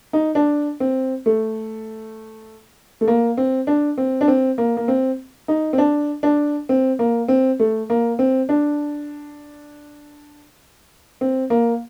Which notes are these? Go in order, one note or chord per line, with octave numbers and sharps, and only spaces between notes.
D#4
D4
C4
A3
A3
A#3
C4
D4
C4
D4
C4
A#3
A#3
C4
D#4
C4
D4
D4
C4
A#3
C4
A3
A#3
C4
D4
C4
A#3